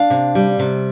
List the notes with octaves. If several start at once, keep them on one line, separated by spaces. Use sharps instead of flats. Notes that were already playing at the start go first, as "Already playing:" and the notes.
Already playing: D4 F5
C3
G3
C3